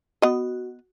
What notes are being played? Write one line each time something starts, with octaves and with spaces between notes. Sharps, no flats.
B3 F#4 D#5